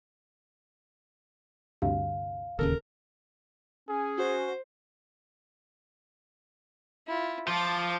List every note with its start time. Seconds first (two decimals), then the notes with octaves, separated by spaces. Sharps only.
1.82 D2 G2 C3 F5
2.59 D1 D#2 C#3 A4 A#4
3.89 C#4 G#4
4.18 F#4 C5
7.07 E4 F4
7.48 F3 F4 A5 D6